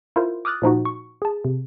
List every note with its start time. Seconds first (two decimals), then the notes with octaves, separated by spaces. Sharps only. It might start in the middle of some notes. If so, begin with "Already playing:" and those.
0.16 E4 F4 A#4 C5
0.45 D6 D#6 F6 F#6 A6
0.62 A#2 F3 D#4 F#4
0.85 C#6
1.22 G#4 A5
1.44 C3